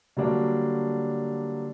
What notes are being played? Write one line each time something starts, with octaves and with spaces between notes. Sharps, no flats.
D3 F#3 G3 A#3 D4 F#4